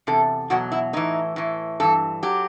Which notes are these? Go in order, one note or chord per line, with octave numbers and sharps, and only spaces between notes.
E2 C3 A4
E2 B2 F#3 F#4
E4
A2 E3 D#4
A2 E3
G2 E3 A4
F#3 G4